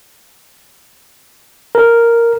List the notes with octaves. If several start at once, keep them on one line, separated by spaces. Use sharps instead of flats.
A#4